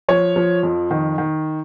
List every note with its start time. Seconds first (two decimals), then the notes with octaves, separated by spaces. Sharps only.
0.08 F3 C#5
0.36 F3
0.63 F2
0.91 D#3
1.18 D#3